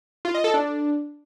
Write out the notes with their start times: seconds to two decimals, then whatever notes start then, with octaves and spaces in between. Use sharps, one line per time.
0.25 F4
0.34 D#5
0.44 A4
0.54 D4